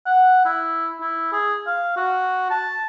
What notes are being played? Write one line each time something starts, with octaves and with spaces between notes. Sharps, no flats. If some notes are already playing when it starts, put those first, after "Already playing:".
F#5
E4
E4
G#4
F5
F#4
A5